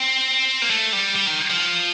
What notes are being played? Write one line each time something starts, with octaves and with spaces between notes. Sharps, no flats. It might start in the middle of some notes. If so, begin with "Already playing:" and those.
Already playing: C4
A#3
A3
G3
G3
D#3
F3